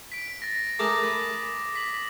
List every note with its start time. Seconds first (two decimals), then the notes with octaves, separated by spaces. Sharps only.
0.12 B6 D7
0.42 A6 A#6
0.79 A3 G#4 A#4 D6 D#6 A#6
1.03 B4
1.75 B6 F#7